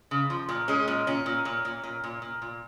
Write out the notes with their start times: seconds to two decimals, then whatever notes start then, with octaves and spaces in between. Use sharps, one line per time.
0.11 C#3
0.30 F3
0.49 A#2
0.68 G#3 C#4
0.88 A#2
1.07 A#2 C#4
1.26 A#2
1.45 A#2
1.65 A#2
1.84 A#2
2.04 A#2
2.22 A#2
2.42 A#2